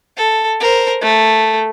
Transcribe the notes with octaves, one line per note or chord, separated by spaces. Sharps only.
A4
A#4 C5
A3